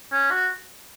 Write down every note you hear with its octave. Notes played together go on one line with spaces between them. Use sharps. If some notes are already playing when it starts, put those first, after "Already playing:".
C#4
F#4